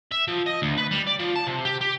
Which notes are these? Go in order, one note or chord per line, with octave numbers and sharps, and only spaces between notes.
E5
F3
D#5
D2
B4
G3
D5
F3
A5
C3
G4
G4